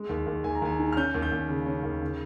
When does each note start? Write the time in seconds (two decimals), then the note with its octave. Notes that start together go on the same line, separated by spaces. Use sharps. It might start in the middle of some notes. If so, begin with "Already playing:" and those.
Already playing: G#3
0.09 D#2
0.27 D#2
0.44 D#2 G#5
0.55 A#5
0.62 D#2 G#5
0.79 D#3
0.92 F6
0.97 C#4 G6
1.14 D#2
1.22 G6
1.32 D#2
1.49 C#3
1.66 C#4
1.84 D#2
2.02 C#3